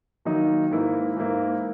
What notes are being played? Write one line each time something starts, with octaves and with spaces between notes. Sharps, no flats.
D#3 F#3 A#3 D#4
G#2 E3 A#3 E4
G#2 E3 A#3 E4